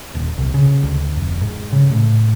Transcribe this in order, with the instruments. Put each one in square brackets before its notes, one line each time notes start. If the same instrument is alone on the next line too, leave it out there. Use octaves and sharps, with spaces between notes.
[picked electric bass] D#1
C2
C#3
D2
F1
G#2
C#3
A2